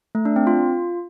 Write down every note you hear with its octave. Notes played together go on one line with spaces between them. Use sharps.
A3
D4
C4
F4